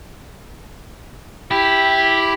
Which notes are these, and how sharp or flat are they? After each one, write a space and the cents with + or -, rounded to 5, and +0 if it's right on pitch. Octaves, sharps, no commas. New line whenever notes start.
E4 +0 G4 +0